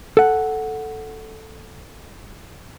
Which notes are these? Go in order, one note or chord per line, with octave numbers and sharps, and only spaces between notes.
A4 F#5